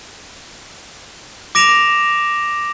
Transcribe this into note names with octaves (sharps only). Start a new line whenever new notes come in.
D6 A#6 D7 E7 F7